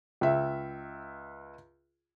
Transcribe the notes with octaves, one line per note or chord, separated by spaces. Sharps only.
C#2 E5